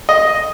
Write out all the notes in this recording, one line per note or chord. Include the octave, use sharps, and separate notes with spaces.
D#5